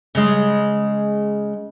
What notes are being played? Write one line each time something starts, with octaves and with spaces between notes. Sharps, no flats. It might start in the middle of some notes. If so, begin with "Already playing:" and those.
C#3 G#3